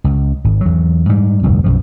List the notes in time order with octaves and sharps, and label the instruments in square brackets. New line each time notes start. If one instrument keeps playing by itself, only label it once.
[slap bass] C#2
G#1
E2 F#3
G#2 G3
D1 G1 C2 F2
B1 F#2 F3